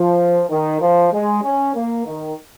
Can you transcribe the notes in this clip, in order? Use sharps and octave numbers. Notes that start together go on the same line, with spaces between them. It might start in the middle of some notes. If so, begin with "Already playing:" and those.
Already playing: F3
D#3
F3
G#3
C#4
A#3
D#3